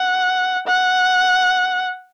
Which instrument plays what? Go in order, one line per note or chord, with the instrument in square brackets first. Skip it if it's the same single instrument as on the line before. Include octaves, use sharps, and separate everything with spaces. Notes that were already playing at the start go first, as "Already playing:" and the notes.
Already playing: [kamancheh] F#5
F#5